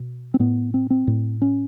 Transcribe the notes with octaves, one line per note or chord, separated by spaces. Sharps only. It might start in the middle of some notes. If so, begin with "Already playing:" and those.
Already playing: B2
C4
A2 B3
C4
C4
A2
C#4